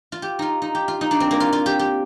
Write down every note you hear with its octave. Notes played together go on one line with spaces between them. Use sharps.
F4
G4
D#4 F4
D#4
G4
F4
D#4
D4
C4
A#3
F4
F4
G4
G4